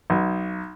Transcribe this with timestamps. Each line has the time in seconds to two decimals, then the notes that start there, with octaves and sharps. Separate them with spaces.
0.10 B1